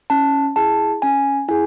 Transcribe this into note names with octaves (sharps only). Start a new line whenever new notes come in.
C#4 A5
E4 G#4 A5
C#4 G#5
E4 G#4 G#5